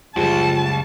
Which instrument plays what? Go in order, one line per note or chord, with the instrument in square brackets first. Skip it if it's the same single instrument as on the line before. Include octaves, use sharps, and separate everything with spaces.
[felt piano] F#1 G3 G#4 [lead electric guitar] C#2 [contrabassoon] F3 [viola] A5